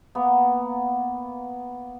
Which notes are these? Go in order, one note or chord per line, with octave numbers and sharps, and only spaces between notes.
A#3 B3